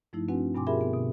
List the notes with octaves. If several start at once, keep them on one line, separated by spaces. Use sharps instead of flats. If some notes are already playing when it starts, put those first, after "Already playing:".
G2 F3 A3 D#4 E4
C4 D4 F#4 B4 F#5 G#5
G2 B2 G5 G#5 C6 D6
F4 G4 G#4 A#4 E5 B5
D3 B3
B2